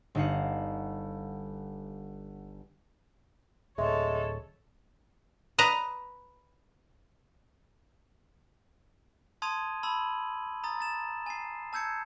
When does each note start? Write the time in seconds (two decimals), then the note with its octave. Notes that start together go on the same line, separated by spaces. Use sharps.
0.15 G1 D#4 F5 F#5
3.78 D1 G#3 A4 C#5 E5 C6
5.58 B4 D#5 A#5
9.42 A5 C6 D#6 G#6 D#7 F7
9.83 A5 B5 E6 F#7
10.64 A#5 D#6 A6
10.80 A6 E7
11.26 G#5 C7
11.73 A5 E6 G6 G#6 C#7